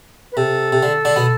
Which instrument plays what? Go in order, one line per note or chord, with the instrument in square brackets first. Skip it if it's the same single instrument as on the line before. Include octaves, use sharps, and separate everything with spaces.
[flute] B4
[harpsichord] C3 [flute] A4
[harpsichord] C3
D3
D3 D4
B2 B3